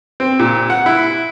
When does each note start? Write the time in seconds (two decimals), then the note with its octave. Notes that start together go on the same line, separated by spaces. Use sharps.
0.20 C4
0.39 A#2
0.70 F#5
0.86 E4